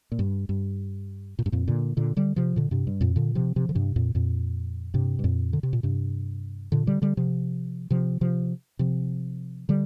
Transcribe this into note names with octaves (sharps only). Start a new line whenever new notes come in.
A#2
G2
G2
A#2
G2
F2 A#2
A#2 D3
A#2 D3
D3 G3
C3 F3
A#2 D3
G2 C3
G2
F2 A#2
A#2 D3
C3 F3
C3 F3
D3
G2 C3
F2 A#2
F2 A#2
G2 C3
G2
F2 A#2
D3
C3
A#2
G2 C3
A#2 D3
D3 G3
D3 G3
C3 F3
C3 F3
C3 F3
C3 F3
D3 G3